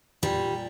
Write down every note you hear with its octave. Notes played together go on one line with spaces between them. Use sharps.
A#2 G3